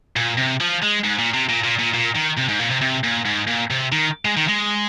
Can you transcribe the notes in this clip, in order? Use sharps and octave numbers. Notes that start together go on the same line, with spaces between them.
A#2
C3
F3
G#3
G#2
A#2
C3
A#2
A#2
A#2
A#2
D#3
C3
G#2
A#2
C3
C3
A#2
G#2
A#2
C3
D#3
G#3
D#3
G#3